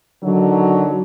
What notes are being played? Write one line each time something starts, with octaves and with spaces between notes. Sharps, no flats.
D3 D#3 F#3